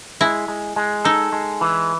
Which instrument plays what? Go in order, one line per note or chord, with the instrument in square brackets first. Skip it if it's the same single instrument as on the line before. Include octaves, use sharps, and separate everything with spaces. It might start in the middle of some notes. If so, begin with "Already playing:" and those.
[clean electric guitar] G#3 [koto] E4
[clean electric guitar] G#3
G#3
[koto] D#4 [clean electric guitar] A4
[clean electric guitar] G#3
E3